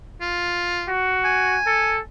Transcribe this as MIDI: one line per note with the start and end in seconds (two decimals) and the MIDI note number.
0.21 0.88 65
0.88 1.58 66
1.25 1.99 80
1.66 2.01 69